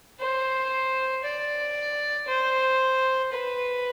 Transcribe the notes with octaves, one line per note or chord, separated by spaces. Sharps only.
C5
D5
C5
B4